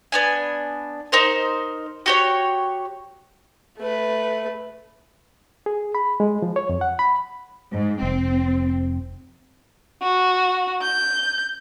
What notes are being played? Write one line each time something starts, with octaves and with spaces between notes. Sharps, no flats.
B3 D4 G#5
D#4 A#4 C5
F#4 G4 C#5
A3 B4
G#4
B5
G#3
F3
C#5
F2
F#5
B5
G#2
F1 C4
F#4
G6